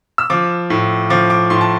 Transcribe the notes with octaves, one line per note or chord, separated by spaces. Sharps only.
E6
F3 D6
A2
F3 D6
D6
A2 C6
A5